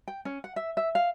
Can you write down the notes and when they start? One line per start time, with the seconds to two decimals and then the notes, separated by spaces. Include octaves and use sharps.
0.08 G5
0.25 C#4
0.44 F#5
0.56 E5
0.77 E5
0.95 F5